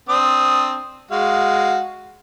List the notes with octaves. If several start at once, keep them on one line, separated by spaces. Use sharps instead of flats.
C4 D4 D#6
G#3 F#4 F5